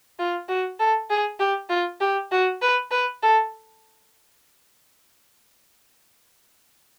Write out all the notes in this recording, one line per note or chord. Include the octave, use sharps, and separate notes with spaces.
F4
F#4
A4
G#4
G4
F4
G4
F#4
B4
B4
A4